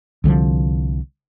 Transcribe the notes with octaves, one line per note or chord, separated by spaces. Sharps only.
C2 D3 E3 F3